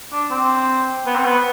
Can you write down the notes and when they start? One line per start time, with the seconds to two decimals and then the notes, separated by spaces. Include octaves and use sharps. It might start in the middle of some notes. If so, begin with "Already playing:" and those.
0.12 D4
0.31 C4
1.06 B3
1.15 C4
1.25 B3